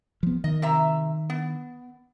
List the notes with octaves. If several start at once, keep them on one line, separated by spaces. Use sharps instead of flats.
F3 B3
D#3 D#5
C3 E5 A#5
B3